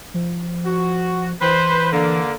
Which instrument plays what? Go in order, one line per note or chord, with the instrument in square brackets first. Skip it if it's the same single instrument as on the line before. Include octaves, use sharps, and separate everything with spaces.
[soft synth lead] F3
[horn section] F#4
[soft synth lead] E3 [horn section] B4 C5
[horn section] D3 A#3